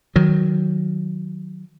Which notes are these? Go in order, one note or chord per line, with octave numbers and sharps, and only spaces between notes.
D#3 F#3